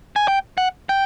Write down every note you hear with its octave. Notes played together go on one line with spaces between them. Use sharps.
G#5
G5
F#5
G5